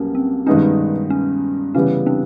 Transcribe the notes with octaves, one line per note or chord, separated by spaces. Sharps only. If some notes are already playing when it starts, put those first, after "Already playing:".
Already playing: B1 B2 G3 A#3 C#4
C4
G2 D#3 G#3 B3 C#4 D#4
C#4
C#3 E3 G3 B3 C#4
C4 D4